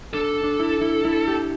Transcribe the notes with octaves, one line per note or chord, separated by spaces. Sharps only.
D4 A4
D4
E4
E4
E4
G4